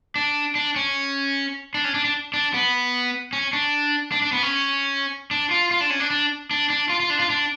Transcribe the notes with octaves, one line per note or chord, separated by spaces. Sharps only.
D4
D4
C#4
D4
C#4
D4
D4
D4
B3
C#4
D4
D4
D4
B3
C#4
D4
F4
F4
D4
C#4
D4
D4
D4
D4
F4
F4
D4
F4
D4